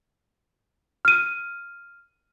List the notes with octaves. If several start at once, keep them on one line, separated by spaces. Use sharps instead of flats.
F6 D#7